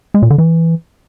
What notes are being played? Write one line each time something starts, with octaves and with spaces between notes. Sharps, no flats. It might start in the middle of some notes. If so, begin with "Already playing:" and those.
G#3
A#2
D3
E3